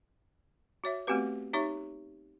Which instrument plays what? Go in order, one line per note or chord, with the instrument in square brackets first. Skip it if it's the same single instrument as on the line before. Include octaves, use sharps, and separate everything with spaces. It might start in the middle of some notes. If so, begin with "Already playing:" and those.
[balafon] F#4 C#5 E5
A3 B3 C4 F#4 G4 B4
D#4 G4 C#5 E5 C#6